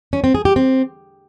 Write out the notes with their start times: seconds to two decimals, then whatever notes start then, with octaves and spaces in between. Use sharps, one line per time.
0.13 C#4
0.24 C4
0.35 G#4
0.45 G4
0.56 C4